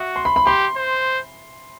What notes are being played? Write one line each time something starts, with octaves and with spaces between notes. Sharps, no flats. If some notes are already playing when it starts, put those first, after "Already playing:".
Already playing: F#4 E5
C6
B5
B5
G4 C6
C5